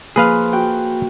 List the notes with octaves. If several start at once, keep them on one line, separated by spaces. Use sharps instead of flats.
F3 A#3 G#4 B4 F5
F#4 G5